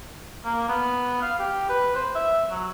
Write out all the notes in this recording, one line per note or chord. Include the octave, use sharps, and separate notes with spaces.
A#3
B3
F5
G4
B4
C5
E5
F#3